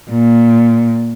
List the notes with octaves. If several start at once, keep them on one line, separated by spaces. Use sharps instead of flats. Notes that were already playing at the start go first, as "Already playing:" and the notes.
A#2